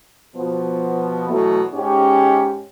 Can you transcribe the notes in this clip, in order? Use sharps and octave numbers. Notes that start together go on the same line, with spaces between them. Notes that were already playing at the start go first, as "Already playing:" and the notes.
B2 F3 B3
B2 E3 F#3 A3
G#2 C#4 G4